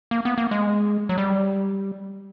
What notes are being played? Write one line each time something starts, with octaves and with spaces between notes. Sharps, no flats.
A#3
B3
A#3
G#3
F#3
G3